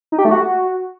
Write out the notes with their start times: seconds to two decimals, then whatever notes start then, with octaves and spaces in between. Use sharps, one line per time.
0.12 D#4
0.18 G4
0.25 A3
0.31 F#4